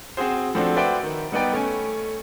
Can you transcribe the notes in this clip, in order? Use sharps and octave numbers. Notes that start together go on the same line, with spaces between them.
C4 F#4 G#4 C5
F3 A3 C4 D4 F#4
F#4 B4 C5 D5 E5 G5
D#3
G3 B3 D#4 B4 D5 G5
A3 C#4 G#5